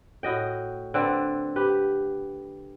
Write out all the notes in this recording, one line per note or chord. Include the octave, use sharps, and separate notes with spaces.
A2 F#4 D#5 G5
D3 C4 A4 B4
G4 B4